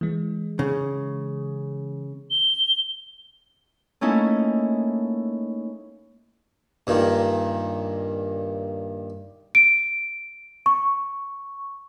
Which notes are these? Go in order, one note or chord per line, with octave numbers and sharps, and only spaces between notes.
E3 G#3
C#3
G7
A3 A#3 C#4 D#4 E4
G2 A#2 D#3
D7
C#6